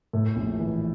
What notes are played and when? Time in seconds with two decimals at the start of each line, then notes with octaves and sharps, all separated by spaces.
0.13 A2
0.36 A#1
0.60 E3